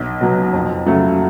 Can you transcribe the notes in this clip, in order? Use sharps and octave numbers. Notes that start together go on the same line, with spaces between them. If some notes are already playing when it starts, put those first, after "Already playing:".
Already playing: B1
B2 F#3
F2
C#3 F#3 A3